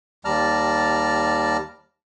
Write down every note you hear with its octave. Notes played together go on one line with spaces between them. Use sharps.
D#2 G3 D5 A5 A#5 F6